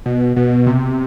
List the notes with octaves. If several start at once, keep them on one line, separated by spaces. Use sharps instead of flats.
B2
B2
C3